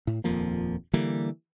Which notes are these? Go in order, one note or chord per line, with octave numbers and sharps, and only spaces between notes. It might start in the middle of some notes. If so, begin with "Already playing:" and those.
A2
D#1 F2 F3 A#3
D3 E3 G3 A#3